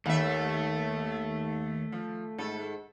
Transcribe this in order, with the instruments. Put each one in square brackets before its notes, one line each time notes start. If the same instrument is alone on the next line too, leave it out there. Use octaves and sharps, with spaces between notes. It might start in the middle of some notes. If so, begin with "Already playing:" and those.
[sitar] D#2 E5 [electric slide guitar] A3
[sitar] F3
G#2 A4